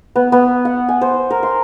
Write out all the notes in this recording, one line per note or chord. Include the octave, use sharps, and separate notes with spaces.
B3
B3
F#5
G#5
C5
A#4
C6